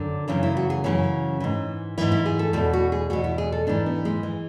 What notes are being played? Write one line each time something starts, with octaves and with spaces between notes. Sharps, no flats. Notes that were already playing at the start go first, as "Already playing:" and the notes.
Already playing: F#2 D3
F#2 C#3 E3 C#4
E4
F#4
G#4
F#2 C#3 E3 C#4
G#2 E3
G#2 E3 E4
E4
G#4
A4
E2 B2 A4
F#4
G#4
E2 B2 F#4
E4
G#4
A4
G#2 E3 D4
B3
G#3
E3